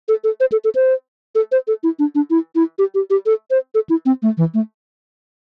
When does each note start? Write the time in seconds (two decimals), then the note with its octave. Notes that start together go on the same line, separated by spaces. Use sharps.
0.08 A4
0.24 A4
0.40 C5
0.52 A4
0.64 A4
0.75 C5
1.35 A4
1.52 C5
1.68 A4
1.83 E4
1.99 D4
2.15 D4
2.30 E4
2.55 E4
2.79 G4
2.95 G4
3.10 G4
3.26 A4
3.51 C5
3.75 A4
3.89 E4
4.06 C4
4.22 A3
4.37 E3
4.54 A3